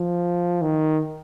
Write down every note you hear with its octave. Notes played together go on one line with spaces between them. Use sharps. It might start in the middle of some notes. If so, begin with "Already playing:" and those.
Already playing: F3
D#3